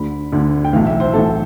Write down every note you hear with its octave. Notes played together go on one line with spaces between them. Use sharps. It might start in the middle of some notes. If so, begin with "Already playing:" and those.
Already playing: D2 D3 B5
D2 D3
G5
B1 A2 E3 F5
E5
C5
B1 A2 E3 A4